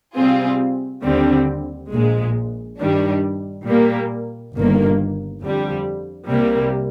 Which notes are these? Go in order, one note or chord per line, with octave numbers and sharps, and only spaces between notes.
C3 G3 C4 F4 G#4
D#2 D3 G3 C4
A#1 A#2 G#3
G2 D#3 G3 D4
A#2 G3 A#3
G1 G2 D#3 A#3
F2 D3 G3
C2 C3 G3 A#3